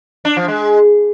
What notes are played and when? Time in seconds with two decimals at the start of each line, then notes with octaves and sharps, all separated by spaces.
0.25 D4
0.36 F3
0.48 G#3